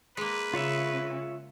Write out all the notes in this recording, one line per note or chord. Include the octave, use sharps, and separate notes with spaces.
G#3 A#3 B4
C#3 F4 C#5 E5